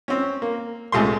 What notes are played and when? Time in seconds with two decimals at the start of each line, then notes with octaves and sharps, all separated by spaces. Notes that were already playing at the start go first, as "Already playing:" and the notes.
0.08 C4 C#4
0.42 A#3
0.92 C#2 C3 A3 C6